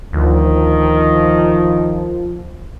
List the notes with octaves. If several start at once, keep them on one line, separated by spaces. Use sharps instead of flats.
D2 D#3 F3